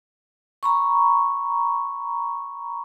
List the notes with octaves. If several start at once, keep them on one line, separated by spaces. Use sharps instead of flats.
A#5 B5 C#6